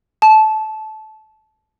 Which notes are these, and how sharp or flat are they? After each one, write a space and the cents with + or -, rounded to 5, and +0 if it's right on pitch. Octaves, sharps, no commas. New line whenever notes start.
A5 -20